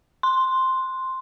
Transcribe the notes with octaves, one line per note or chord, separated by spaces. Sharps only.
C6